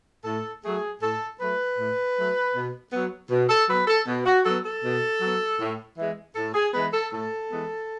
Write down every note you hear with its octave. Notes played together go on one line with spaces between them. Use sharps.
A2 A4
F#3 A3 G#4
A2 A4
F#3 A3 B4
A2
F#3 A3
B2
F#3 B3
B2
A4
F#3 B3 B4
A4
B2
F#4
F#3 B3 A4
A4
B2
F#3 B3
A2
E3 G#3 B3
A2 A4
G#4
E3 G#3 B3 B4
A4
A2 A4
E3 G#3 B3